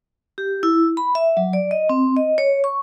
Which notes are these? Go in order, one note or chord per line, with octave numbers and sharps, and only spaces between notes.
G4
E4
B5
E5
F#3
D5
D#5
C4
D#5
C#5
C#6